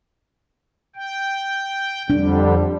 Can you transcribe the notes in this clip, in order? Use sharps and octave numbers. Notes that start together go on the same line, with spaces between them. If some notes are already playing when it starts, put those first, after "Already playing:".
G5
F2 D3 G3 D4